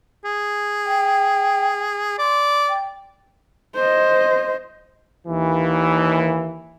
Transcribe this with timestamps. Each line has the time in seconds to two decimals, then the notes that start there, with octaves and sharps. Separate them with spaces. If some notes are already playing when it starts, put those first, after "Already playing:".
0.25 G#4
0.86 G5
2.19 D5 C6
2.69 G5
3.75 C5 D#5
5.28 D#2 E3